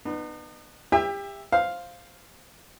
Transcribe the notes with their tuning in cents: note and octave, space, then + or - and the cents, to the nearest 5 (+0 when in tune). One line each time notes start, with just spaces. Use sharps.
B3 +0 D#4 -40
G4 +30 E5 +0 G5 +45
C5 +0 F5 +0